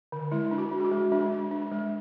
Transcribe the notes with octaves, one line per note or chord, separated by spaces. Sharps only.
D3
G#3 E4
D4
F#4
D4
G#4
F#4
G#3
G#3 D4
D4
D4
G#3